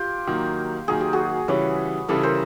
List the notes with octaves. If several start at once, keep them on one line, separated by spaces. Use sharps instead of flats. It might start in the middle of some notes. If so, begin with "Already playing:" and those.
Already playing: F4 G4
D#3 F#3 A#3
D#3 F#3 A#3 G#4
G4
F#4 G#4
C#3 E3 G3 B4 C#5
C#3 E3 G3 A4 B4
A#4 C5